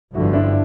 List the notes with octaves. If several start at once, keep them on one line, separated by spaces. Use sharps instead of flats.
G1 G2 D3 F3 E4 F#4
D4 E4